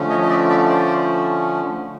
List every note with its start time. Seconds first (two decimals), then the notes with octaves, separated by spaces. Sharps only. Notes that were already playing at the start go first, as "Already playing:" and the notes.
Already playing: D3 F3 A3 C#4
0.10 C#5 D#5
0.23 D#5
0.30 D5 E5
0.50 D5 E5
0.70 C5 D5